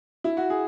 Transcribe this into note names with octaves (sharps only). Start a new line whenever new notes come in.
E4
F#4
G#4